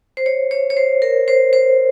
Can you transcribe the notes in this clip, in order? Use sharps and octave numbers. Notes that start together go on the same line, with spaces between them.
C5
C#5
C#5
C#5
C5
A#4
C5
C5